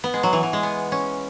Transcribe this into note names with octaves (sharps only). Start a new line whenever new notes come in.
B3
G#3
F#3
E3
E3
G#3
B3
C#4